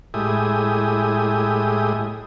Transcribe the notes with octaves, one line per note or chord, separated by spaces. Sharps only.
A2 G#3 E4 G4 D#6